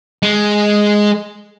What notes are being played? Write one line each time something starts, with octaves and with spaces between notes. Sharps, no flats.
G#3